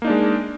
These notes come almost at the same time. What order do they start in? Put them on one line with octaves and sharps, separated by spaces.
A#3 D#4 D4 G#3